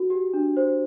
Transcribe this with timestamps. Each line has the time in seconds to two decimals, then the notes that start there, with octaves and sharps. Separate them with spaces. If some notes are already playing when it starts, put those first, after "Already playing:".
Already playing: F#4
0.10 G4
0.34 D4
0.57 C5